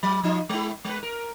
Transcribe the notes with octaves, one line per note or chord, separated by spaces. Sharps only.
F#3
F3 D#4 F4
G#3 E4
G#3 B4
A#4